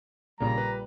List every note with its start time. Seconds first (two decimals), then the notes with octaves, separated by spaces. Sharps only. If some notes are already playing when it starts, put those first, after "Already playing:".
0.40 A#1 A#2 C#3 G3 A#3 A#5
0.58 B4